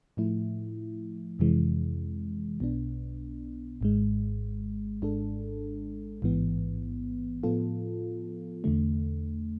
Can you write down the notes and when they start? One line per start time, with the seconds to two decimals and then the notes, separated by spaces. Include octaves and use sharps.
0.17 A2 F3 A3 E4
1.39 F2 C3 E3 G#3
2.60 B1 B2 B3 D4
3.81 G#1 G#2 G#3
5.02 G#1 G#2 G#3 D4 A4
6.22 A1 G#2 E3 B3
7.43 A2 F3 B3 F4 A4
8.64 E2 D3 A3